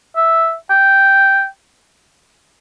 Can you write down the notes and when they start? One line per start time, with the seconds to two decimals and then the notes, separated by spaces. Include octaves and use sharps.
0.16 E5
0.70 G5